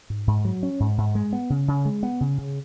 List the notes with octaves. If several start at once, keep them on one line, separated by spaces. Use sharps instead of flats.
G#2
G#2
F#3
C#4
G#2
G#2
G#3
B3
C#3
C#3
G#3
B3
C#3
C#3